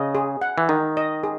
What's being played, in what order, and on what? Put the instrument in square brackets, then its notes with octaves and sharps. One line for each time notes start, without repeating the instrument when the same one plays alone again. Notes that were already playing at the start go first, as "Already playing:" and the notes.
Already playing: [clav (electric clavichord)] C#3 [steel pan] D#5
[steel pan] G#4
F#5
[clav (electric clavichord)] E3
[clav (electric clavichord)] D#3 [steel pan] D#4
[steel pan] D#5
G#4